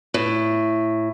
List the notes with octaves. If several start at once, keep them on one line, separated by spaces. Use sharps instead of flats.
A2